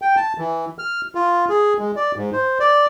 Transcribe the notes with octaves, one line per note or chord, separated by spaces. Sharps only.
G5
A5
E3
F6
F4
G#4
G#3
D5
G#2
C5
D5